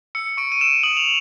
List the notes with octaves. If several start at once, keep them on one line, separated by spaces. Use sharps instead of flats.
E6 C#7
C#6 D7
D#7
E6 E7
D#6 F#7
F7